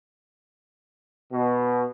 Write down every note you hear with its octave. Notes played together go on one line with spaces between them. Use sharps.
B2